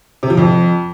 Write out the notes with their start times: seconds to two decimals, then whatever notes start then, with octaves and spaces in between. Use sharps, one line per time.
0.23 C3
0.30 F3
0.37 F2